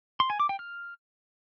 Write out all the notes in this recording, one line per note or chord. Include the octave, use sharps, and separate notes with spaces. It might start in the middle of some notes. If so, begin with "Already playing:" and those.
C6
G#5
D6
G5
F6